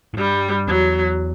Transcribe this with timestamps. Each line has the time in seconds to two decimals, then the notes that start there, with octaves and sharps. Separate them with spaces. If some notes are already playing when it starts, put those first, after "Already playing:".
0.14 A2
0.17 G2 G3
0.67 E2 F#3